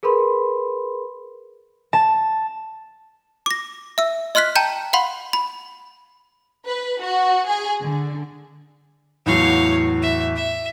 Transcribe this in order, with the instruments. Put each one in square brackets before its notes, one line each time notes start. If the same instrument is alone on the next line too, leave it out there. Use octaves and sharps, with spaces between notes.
[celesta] G#4 A#4 B4 B5 C6
[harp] A5
[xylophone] D6 A#6
E5 E6
D#5 C6 F6 F#6 B6
G5 A5 A#5 G6
F5 F#5 B5 C6
B5
[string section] B4
F#4
G#4
D3
[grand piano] E2 A2 F#3 [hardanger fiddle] C#5 F5
[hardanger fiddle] E5
E5